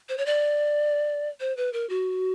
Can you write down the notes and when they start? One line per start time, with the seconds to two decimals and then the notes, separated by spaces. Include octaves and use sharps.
0.09 C5
0.18 C#5
0.26 D5
1.40 C5
1.57 B4
1.73 A#4
1.90 F#4